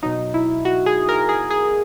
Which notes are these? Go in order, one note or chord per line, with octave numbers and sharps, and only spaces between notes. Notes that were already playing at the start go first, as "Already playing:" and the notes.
B2 F#3 D#4
E4
F#4
G#4
A#4
G#4
G#4